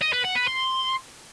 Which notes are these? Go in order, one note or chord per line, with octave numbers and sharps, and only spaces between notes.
D#5
B4
F#5
B4
C6